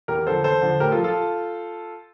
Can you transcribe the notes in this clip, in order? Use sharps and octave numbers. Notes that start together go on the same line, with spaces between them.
E2 G4 A#4
D3 F3 A4 C5
E2 A4 C5
D3 F3
A2 G4 A#4
F4 A4
F3
F4 A4